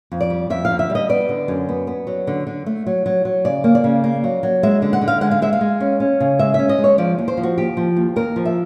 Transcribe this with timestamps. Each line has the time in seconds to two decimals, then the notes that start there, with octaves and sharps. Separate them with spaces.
0.12 F2
0.21 D5
0.30 G3
0.50 F2 E5
0.65 F5
0.70 D3
0.79 E5
0.90 G3
0.95 D#5
1.09 B3 D5
1.29 D3
1.48 F#2
1.69 B3
1.87 B3
2.07 F#3
2.27 D3
2.47 D3
2.66 A3
2.86 F#3
3.06 F#3
3.25 F#3
3.45 C#3 D5
3.64 A#3
3.75 D5
3.84 C#3
4.04 A#3
4.24 F#3
4.43 F#3
4.63 G#3 E5
4.82 D3
4.93 F#5
5.02 D3
5.08 F5
5.21 G#3 F#5
5.31 F5
5.42 G#3 E5
5.53 F5
5.61 G#3
5.80 C#4
6.00 C#4
6.20 C#3
6.39 G#3 E5
6.54 C#4 E5
6.69 D#5
6.79 G#3
6.84 C#5
6.98 F3 D5
7.18 D#2
7.28 C5
7.37 F3
7.43 F#4
7.58 D#2 G4
7.77 F3
7.96 D#2
8.16 D#2 A#4
8.36 F3
8.45 E5